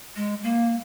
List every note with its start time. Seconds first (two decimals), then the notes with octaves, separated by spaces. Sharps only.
0.16 G#3
0.43 A#3